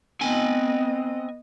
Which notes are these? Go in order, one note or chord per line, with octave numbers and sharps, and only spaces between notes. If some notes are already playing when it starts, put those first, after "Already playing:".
B3 C4 D#5 G#5